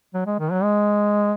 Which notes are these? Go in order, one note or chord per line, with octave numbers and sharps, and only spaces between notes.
F#3
G#3
D#3
F#3
G#3